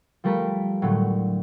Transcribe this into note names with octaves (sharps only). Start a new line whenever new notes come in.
F3 G3 A3 A#4 A5 B6
A2 D3 F#3 A3